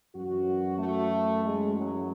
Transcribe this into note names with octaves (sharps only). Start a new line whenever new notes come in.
F#2 E3 F#4
A3
G#3
F#3